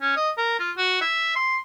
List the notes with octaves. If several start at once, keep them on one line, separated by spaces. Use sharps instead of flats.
C#4
D#5
A#4
F4
F#4
E5
C6